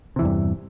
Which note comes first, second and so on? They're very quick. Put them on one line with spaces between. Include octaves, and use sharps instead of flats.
C3 E3 E2 G2